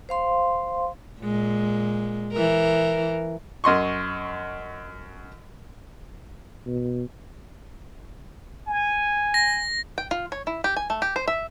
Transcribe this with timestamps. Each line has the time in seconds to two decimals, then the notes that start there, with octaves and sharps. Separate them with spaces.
0.09 C5 F5 C6
1.21 A#2 G#3
2.33 E3 A#4
3.64 F#2 D#5 C6 C#6
6.66 B2
8.67 G#5
9.34 A#6
9.98 G5
10.11 F4
10.32 C#5
10.47 E4
10.64 G4
10.77 G#5
10.90 A3
11.02 G4
11.16 C5
11.28 E5